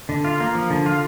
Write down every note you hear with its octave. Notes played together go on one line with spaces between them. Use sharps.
D3
F4
A#3
F3
D3
F4